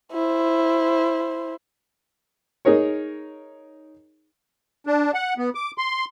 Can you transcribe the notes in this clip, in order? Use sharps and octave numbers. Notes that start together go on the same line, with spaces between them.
E4 C5
D#4 G#4 A#4 C#5
D4
F#5
B3
D6
C6